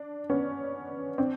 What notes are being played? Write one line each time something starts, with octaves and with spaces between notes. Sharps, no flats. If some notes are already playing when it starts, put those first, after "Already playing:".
Already playing: D4
B3 C#4
C4 D4